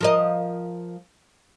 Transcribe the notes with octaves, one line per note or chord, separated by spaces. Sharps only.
F3 A#4 D#5